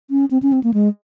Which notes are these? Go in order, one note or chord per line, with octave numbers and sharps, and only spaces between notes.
C#4
C4
C#4
C4
A#3
G#3